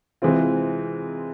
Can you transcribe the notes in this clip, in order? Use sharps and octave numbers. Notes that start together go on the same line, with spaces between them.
C3 E3 G#3 C4 F4